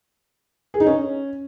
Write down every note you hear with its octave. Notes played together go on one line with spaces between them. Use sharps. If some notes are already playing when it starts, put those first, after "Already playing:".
G#4
D#4
C#4